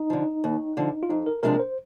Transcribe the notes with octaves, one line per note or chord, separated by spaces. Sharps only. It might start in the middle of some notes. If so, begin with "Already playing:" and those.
Already playing: D#4
D3 F3
D#2
D3 F3
F4
F2 D#4
A#4
C3 F3 G#3 D4 A#4
C5